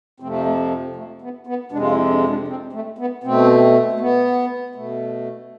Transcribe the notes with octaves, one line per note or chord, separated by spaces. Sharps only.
F2 C3 F3 A3 C4
A3
A3
B3
B3
F2 C3 G#3 D4
F4
E4
D4
D4
C4
A3
B3
B2 A3 C4
A3
B3
B2 A3